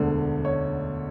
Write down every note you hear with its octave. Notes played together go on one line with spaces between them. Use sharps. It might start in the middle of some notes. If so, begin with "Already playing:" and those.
Already playing: E1 D2 D3
C#5